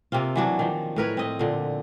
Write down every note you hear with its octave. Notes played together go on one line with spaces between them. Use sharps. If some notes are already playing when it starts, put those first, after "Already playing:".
C3 A#3 C4 F4
E3 F#3 D4
D#3 F3
A2 A#4 B4 C#5
C4 D#5
A#2 D3